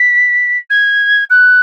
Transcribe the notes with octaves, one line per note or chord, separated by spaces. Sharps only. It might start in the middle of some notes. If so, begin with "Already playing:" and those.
Already playing: B6
G#6
F#6